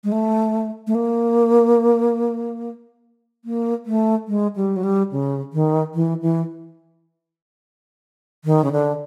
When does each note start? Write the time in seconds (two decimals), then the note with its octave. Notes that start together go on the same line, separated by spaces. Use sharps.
0.04 G#3
0.12 A3
0.87 A3
0.95 A#3
3.45 A#3
3.86 A3
4.28 G#3
4.56 G3
4.76 F#3
4.83 G3
5.11 C#3
5.53 D#3
5.94 E3
6.22 E3
8.45 D#3
8.64 C#3
8.72 D3